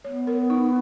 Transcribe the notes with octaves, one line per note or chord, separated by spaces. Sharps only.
B3 C#5
A#4
D#4